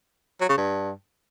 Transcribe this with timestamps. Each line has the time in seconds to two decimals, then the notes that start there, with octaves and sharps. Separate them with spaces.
0.41 F#3
0.49 C#3
0.58 G2